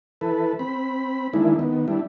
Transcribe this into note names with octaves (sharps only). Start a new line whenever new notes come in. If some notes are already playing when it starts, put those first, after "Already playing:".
E3 A4 B4
C4 B5
D#3 E3 G#3 A#3 D4 E4
D#3 B3
G3 D4 E4